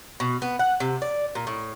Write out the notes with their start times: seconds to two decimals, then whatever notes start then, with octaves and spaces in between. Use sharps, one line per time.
0.20 B2
0.42 B3
0.59 F#5
0.80 C3
1.02 D5
1.35 A#2
1.47 A2